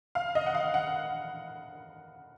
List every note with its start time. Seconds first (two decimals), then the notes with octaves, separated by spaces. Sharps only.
0.15 F5
0.35 D#5
0.46 F#5
0.55 F5
0.74 F#5